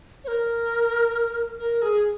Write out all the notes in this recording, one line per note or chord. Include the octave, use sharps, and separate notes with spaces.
C#5
A#4
A#4
G#4